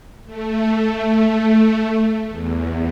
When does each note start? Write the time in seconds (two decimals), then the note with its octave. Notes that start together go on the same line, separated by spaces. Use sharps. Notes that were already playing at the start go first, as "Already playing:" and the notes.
0.26 A3
2.28 E2